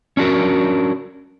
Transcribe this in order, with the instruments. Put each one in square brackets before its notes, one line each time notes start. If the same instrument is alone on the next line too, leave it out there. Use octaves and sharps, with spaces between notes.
[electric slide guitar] C#4 D4 F#4 A#4